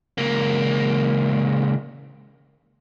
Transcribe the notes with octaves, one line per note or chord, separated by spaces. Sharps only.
C#2 A#3